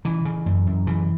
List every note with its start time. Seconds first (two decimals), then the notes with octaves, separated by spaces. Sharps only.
0.05 C#3 E3
0.25 C#3
0.46 F#2
0.67 F#2
0.87 C#3 E3